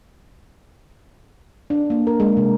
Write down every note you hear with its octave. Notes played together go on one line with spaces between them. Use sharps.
D4
A#3
A#4
G#3
C3